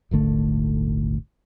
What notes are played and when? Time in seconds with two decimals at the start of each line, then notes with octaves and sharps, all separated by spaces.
0.11 D#1 G#1 D3 A3